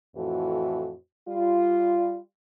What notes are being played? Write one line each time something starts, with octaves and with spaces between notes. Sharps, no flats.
F2 A2 E3 F#4
G3 F4